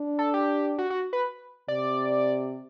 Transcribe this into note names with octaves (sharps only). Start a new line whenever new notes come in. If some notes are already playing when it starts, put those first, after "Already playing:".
Already playing: D4
A4
G4
F#4
F#4
B4
C3 D5